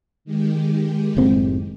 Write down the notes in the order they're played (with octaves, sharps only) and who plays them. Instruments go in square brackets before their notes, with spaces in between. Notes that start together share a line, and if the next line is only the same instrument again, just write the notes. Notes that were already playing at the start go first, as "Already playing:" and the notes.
[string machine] D#3 G#3 G4
[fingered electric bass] F#1 A2 C4